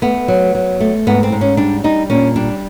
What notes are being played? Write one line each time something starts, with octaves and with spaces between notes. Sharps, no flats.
A3 B3
F#3
F#3
A3
G#2 B3
C4
G#2
C#4
G3 D4
G3 D#4
A#2 C#4
G3 D4